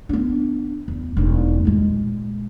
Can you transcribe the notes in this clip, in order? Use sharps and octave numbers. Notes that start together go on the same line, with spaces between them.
B3 D4
E2
E1 D#4
A#2 G#3